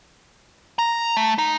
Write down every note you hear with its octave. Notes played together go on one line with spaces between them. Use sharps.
A#5
A3
D#4